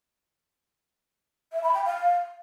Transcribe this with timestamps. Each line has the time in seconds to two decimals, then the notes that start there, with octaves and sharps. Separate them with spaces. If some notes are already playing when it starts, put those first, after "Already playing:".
1.52 E5
1.63 B5
1.74 G5
1.85 F5